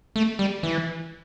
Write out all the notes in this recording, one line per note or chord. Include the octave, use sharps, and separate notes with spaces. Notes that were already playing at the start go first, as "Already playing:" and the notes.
A3
G3
E3